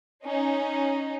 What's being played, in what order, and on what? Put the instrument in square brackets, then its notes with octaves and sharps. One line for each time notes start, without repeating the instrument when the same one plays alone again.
[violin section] C#4 D#4